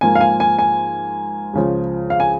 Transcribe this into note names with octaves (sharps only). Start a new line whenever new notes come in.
G#2 F3 A#3 G#5
F5
G#5
G#5
G#5
C#2 C#3 F3
F5
G#5